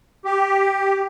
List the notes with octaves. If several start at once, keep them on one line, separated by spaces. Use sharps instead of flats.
G4